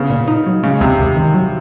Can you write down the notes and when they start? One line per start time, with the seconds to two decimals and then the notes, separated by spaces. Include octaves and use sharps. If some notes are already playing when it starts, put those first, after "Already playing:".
Already playing: C#3 B3
0.10 A#2
0.27 D#4
0.46 F#3
0.63 C#3 G#3
0.81 D#2 C3
0.99 D#2
1.17 D#3
1.34 F#3